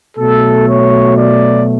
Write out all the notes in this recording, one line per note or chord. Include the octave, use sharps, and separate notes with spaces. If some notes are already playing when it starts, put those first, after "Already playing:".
B2 F#3 A3 A4
C#5
D5